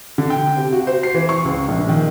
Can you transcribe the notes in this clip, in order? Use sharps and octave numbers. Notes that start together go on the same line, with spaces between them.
D3
G5
C3
F#4
C5
C7
E3
C#6
C#2
A#1
D#3